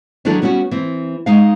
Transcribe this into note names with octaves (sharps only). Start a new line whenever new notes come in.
D#3 E3 F#3 D4 E4 A4
G3 B3 C#4 F4 F#4
E3 C4
G#3 D#4 F5